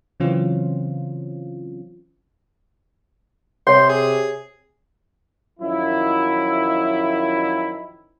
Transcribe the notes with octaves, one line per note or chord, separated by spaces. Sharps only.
C#3 E3 F#3 C4 C#4 F4
C3 C#5 C6
G#4
F#2 D#3 F3 F#3 E4